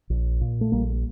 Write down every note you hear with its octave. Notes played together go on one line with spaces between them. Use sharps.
A#1
A#2
A3
A#1 G3 A#3